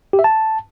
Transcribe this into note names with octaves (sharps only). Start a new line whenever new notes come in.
G4
E5
A5